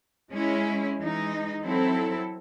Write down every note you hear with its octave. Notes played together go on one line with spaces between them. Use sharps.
G#3 C#4 E4
E3 G#3 D#4
F#3 C4 E4 A4